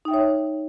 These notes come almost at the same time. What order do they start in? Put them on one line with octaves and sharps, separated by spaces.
D#4 G5 E5 C#5